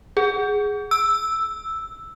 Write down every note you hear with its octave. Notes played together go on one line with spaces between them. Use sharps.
G#4
E6